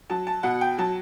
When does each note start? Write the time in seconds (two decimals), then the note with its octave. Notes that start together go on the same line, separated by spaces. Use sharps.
0.10 F#3 A5
0.27 A5
0.43 B2 F#5
0.61 G5
0.78 F#3 A5